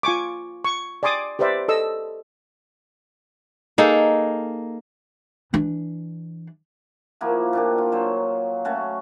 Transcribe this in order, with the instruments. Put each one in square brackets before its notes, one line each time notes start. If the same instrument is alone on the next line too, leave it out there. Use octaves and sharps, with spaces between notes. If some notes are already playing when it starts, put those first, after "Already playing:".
[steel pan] F4 G#5 C#6 D6
C#6
D5 G#5 C6 D6 D#6
G4 B4 C5 D5 E5
A4 D#5 E6
[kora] A#3 D#4 G#4 A4
[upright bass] E3 D4
[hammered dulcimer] F3 A#3 E4 F#4
A#2 D4 G4
F4
F#3 F4 C5 C#5
A3 C#4 F#4